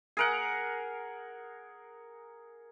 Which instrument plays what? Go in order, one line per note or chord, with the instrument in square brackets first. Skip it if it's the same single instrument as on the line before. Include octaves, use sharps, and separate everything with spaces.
[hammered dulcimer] G#4 A#4 F#5